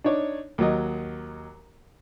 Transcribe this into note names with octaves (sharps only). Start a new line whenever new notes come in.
D4 D#4 C#5 D5
D#2 F#3 D#5